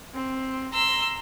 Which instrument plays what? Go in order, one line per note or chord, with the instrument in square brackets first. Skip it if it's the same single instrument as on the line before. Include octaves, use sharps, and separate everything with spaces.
[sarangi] C4
[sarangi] A#5 [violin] C6 E6